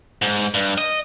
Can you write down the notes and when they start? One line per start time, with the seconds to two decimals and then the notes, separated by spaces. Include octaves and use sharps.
0.22 G#2
0.54 G2
0.78 D#5